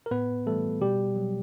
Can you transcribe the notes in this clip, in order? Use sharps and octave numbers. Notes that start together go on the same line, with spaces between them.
A#4
A2 B3 B4
E3 G3 A3 A4
B2 G3 G4
F#3